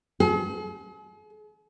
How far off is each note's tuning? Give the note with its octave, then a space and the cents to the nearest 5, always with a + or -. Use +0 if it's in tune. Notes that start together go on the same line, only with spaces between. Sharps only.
G#4 +45